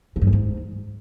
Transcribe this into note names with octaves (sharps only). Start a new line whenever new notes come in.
C#3
G2
F#2
G#2